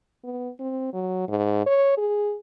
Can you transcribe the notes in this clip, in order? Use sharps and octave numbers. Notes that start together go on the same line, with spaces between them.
B3
C4
F#3
G#2
C#5
G#4